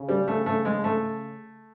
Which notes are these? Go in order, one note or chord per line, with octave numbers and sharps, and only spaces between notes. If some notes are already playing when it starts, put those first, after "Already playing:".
Already playing: C#3
G3
A3
A3
G#3
A3